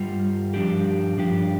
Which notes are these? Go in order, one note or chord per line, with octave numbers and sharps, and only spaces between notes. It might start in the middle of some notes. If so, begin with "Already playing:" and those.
Already playing: G2 G3 F4
G2 F3 D4 G4
G2 F3 D4 G4